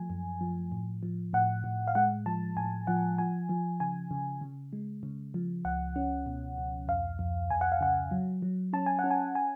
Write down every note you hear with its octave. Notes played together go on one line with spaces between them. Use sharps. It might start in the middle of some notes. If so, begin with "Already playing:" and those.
Already playing: F3 A3 G#5
F#2
F3
A2
F3
A2 F#5
A2
F5
G#3 F#5
F3 A5
A2 G#5
F3 F#5
F3 G#5
F3
C#3 G#5
C#3
C#3
G#3
C#3
F3
C#2 F#5
C#4
B2
C#2
F2 F5
F2
F2 G#5
F#5
F5
C#3 F#5
F#3
F#3
C#4 A5
G#5
F#5
C#4
G#5
G#5